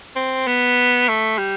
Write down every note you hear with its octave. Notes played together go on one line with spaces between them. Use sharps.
C4
B3
A3
G3